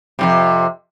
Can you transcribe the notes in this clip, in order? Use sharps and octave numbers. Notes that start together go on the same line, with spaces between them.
F2 A2 C3